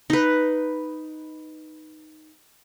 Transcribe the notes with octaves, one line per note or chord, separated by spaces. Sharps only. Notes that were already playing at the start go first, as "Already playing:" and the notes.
D#4 B4